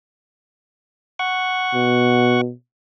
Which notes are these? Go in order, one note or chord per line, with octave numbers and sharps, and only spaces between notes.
F#5 C#6
B2